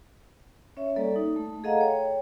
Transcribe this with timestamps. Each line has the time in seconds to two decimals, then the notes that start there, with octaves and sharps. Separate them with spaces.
0.77 C#4 C#5 E5
0.96 G3 A#3 A4 D5
1.16 D#4
1.36 A3
1.64 G#4 A4 D#5 F5 F#5 A#5
1.80 C#5 G5